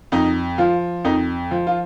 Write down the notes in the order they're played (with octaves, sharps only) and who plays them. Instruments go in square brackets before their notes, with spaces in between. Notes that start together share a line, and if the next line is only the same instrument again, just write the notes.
[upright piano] F2 D#4
F3 F4
F2 D#4
F3
F4